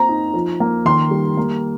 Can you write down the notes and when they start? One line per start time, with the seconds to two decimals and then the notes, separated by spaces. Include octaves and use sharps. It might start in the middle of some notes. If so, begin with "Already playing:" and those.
Already playing: A#3 C4 F4 A#5
0.09 D#4
0.34 F3
0.60 A#3
0.85 D#3 C6
1.11 G3
1.37 A#3